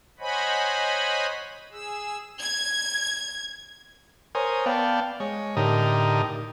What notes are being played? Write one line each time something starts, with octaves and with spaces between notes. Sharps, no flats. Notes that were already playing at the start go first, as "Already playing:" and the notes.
C5 C#5 D#5 F#5 G#5 B5
G#4 E6
G#6
A#4 C5 C#5 G#5 D#6
B3 D5 F5 G5 A5
G#3 C#5
A2 D3 D#4 G4 A#4 D#6